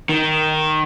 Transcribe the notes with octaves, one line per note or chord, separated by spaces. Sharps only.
D#3